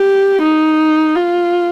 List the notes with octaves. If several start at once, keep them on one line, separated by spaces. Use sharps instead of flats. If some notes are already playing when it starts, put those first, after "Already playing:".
Already playing: G4
D#4
F4